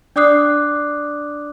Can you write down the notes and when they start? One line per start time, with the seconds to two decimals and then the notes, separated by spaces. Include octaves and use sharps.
0.16 D4 D5 D6 D#6 F#6 C7